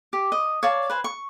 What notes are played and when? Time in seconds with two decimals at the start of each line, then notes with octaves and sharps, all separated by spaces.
0.13 G4
0.32 D#5
0.63 C#5 D5 F5 A5
0.90 B4 C5 G#5
1.04 C#6